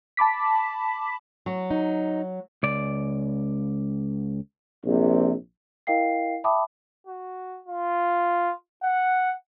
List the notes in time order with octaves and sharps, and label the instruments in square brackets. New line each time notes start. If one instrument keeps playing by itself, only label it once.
[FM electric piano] A5 B5 D6 B6
[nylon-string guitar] F#3
[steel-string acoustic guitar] D#4
[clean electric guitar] C#2 D5
[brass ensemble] A#1 C3
[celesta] E4 A#4 D#5 F5 G5 C7
E5 G5 A5 B5 D6 D#6
[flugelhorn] F#4
F4
F#5